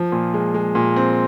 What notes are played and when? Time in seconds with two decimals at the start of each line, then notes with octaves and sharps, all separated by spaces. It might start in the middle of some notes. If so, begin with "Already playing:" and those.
Already playing: F3
0.12 A#2
0.34 G#3
0.54 G#3
0.75 A#2
0.96 C4